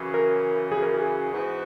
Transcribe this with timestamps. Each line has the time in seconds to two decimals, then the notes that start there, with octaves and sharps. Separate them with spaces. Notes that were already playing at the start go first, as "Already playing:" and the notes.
Already playing: F#2 C#3 E3
0.14 A#4
0.72 G#4
0.83 A#4
0.94 G#4
1.31 G#2 E3 B3 F#4